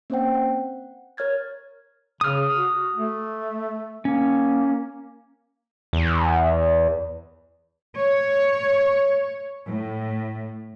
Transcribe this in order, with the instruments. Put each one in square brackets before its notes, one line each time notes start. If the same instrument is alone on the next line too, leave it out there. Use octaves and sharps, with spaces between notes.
[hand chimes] A#3 C4 C#4 C5 F#5 G5
F#5
A#4 C#5 F6 G#6 A6
[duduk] C#3 [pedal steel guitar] D#6 F6
[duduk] F#4
A3
[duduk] A#3 [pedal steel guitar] C#4
[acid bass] E2
[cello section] C#5
A2